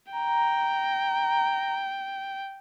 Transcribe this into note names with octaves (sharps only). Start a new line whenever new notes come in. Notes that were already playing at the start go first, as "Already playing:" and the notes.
G5 A#5